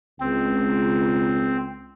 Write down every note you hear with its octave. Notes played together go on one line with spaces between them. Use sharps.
C#2 C4